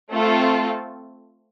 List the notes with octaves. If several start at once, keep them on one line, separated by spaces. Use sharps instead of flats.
A3 C4 F4 A4